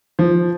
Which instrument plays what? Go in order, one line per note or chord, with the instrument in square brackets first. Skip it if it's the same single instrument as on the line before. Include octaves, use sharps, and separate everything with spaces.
[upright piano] F3